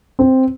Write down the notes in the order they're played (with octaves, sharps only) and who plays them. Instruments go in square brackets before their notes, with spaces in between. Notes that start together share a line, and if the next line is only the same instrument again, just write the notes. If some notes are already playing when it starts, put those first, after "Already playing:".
[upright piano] C4